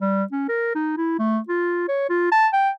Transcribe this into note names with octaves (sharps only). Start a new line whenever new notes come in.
G3
C#4
A#4
D#4
E4
A3
F4
C#5
F4
A5
G5